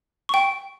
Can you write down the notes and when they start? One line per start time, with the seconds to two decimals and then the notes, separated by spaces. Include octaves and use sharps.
0.29 G5 C#6